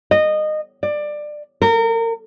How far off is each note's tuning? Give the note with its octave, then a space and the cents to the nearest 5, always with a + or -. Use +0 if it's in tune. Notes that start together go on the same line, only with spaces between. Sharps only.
D#5 -20
D5 +20
A#4 -30